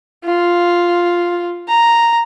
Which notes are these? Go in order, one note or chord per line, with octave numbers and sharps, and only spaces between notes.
F4
A#5